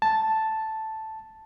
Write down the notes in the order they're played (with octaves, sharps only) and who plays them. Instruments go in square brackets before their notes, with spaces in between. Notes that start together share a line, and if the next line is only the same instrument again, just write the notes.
[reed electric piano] A5